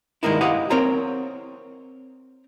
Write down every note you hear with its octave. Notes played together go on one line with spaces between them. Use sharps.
G2 D#3 G#3 A#3 D#4 E4
E4 G4 C5 D#5 F5 F#5
C4 A#4 C5 C#5 A#5